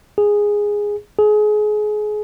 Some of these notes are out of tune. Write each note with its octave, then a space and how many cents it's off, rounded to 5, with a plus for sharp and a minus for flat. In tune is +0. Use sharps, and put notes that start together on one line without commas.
G#4 -10
G#4 +25